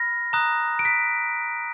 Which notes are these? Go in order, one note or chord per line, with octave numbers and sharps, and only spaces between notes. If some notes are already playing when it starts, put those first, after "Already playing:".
Already playing: B5 F6 A#6
A#5 D#6 F#6
D7
B6